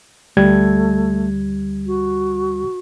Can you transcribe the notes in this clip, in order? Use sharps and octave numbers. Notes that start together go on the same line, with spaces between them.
D2 G3 A3 G#6
F#4